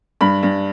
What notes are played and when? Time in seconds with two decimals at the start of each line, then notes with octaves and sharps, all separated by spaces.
0.21 G2 B5
0.43 G2